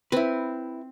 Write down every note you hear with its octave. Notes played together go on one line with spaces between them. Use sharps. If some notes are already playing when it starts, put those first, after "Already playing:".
C4 E4 B4